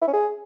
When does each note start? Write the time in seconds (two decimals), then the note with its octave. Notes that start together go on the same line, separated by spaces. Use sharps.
0.01 E4
0.07 C#4
0.13 G#4